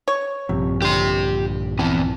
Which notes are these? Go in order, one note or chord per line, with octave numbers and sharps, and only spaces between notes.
C#5
A#1 G2 C3 F3
A#2 D3 G3 G4 C6
E2 E3 C4 G5 A5